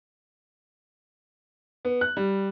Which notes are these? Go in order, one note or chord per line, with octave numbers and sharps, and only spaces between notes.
B3
F#6
G3